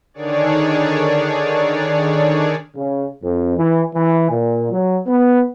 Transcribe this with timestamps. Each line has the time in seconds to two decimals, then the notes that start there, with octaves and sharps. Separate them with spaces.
0.14 D3 D#3 D4 G#4 C#5 D5
2.76 C#3
3.23 F2
3.58 E3
3.95 E3
4.31 A#2
4.71 F#3
5.07 B3